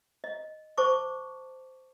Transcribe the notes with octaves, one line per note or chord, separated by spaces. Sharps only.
D#5
C5 A5 C#6 D6